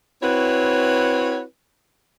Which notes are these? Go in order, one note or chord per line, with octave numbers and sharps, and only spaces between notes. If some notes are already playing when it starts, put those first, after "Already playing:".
C4 E4 F#4 B4 C#5